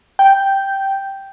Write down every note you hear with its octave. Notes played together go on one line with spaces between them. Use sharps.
G5